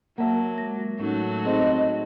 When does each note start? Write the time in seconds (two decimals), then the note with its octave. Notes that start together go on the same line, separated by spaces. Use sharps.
0.18 F#3 A#3 E5 F#5 A5
0.58 G#3 A#6
1.00 A2 F#3 A3 C#4 D#4 F#4
1.45 C4 D#4 G#4 A4 C5 D#5